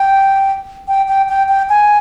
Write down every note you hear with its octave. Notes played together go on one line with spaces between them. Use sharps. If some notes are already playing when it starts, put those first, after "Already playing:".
Already playing: G5
G5
G5
G5
G5
G#5